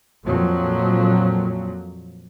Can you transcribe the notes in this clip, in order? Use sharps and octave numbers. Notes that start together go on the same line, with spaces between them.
F2 A#2 F3 F#3